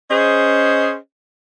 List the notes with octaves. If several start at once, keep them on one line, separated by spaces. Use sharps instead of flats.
C#4 G#4 C5 D#5